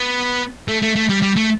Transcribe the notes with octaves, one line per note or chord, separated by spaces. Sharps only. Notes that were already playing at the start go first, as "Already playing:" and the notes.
Already playing: B3
A3
A3
A3
G3
G3
A3